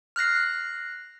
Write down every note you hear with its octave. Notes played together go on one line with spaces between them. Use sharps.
F6 F#6 A#6 C7